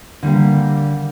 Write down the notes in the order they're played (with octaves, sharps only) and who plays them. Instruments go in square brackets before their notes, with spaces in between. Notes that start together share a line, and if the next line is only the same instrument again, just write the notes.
[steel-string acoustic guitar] D3 G3 A#3